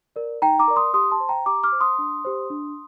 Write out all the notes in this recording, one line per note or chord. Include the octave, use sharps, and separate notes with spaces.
A#4 D5
D#4 G5 A#5
A#5 D6
A#4 D5
C6 D#6
G4 C6 D#6
A5 C6
C5
G5 A#5
G4 A#5 D6
D6 F6
C5
C6 D#6
D4
G4 C5
D4